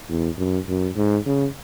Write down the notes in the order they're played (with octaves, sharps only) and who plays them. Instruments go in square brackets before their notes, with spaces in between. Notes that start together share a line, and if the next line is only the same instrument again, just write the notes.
[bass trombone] E2
F#2
F#2
G#2
C#3